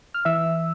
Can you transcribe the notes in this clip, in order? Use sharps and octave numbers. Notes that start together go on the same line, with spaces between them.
F6
E3 E5 E6